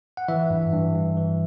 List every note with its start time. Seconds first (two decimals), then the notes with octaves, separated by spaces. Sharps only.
0.17 F#5
0.28 E3 E5
0.50 G2
0.73 G2
0.95 G2
1.17 E3